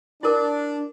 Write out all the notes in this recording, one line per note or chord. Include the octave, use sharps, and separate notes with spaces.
D4 E4 A#4